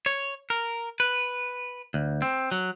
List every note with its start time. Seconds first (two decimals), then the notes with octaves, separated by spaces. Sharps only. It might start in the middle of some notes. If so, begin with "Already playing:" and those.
0.06 C#5
0.50 A#4
1.00 B4
1.94 D2
2.22 C4
2.52 F#3